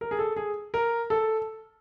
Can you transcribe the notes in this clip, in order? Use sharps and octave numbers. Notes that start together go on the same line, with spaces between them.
A#4
G#4
A4
G#4
A#4
A4